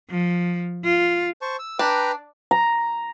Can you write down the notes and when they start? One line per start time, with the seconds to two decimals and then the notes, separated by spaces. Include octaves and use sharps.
0.10 F3
0.84 F4
1.42 C5 A5 C#6
1.59 E6
1.79 D4 B4 G5 A#5
2.51 A#5